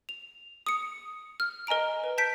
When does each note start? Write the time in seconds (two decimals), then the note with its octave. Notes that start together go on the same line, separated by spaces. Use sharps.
0.09 F7
0.66 D#6 C#7
1.40 F6
1.67 A#4 D#5 G#5 A#5 D7
2.04 B4
2.18 A5 G6 B6 D7